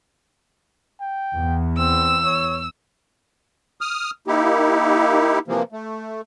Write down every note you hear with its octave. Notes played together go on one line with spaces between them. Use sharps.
G5
E2
C4 E6
C#5
D#6 F6
A#3 D#4 E4 G4
C3 E3 F3 A#3
A3